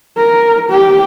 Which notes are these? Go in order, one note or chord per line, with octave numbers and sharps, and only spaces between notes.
A#4
G4